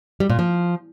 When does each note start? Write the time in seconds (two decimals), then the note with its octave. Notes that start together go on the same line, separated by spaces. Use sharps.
0.20 G3
0.30 A#2
0.39 F3